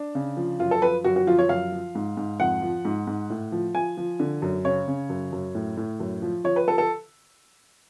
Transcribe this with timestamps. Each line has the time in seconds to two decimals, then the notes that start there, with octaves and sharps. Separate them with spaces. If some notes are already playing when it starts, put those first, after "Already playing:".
Already playing: D4
0.15 C#3
0.37 F3
0.60 F#2 F4
0.71 A4
0.82 F3 B4
1.04 F#2 F#4
1.16 F#4
1.27 F3 F4
1.39 C#5
1.49 F#2 F5
1.72 F3
1.95 G#2
2.17 G#2
2.40 F2 F#5
2.62 F3
2.85 G#2
3.07 G#2
3.30 A2
3.52 F3
3.75 F3 G#5
3.97 F3
4.20 D3
4.42 F#2
4.65 C#3 C#5
4.88 C#3
5.09 F#2
5.33 F#2
5.55 A2
5.77 A2
6.00 F#2
6.22 F3
6.44 F3 C#5
6.56 B4
6.67 F3 A4
6.78 A4